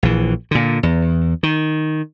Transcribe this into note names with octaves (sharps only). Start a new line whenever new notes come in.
A#1 E3
A#2 D3
E2
D#3